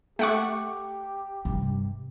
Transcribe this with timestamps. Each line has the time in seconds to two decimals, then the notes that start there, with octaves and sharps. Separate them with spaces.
0.19 A3 G4 F#5 C#6
1.45 G2 C3